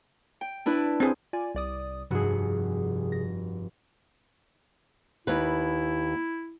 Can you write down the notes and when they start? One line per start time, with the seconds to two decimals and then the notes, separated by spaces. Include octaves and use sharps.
0.41 G5
0.66 D4 E4 B4
1.00 C4 G#4
1.33 F4 D5 G#5
1.55 C2 D5 D#6
2.11 F1 G2 C3 F#4 G#4
3.12 A#6
5.27 D#2 E4 B4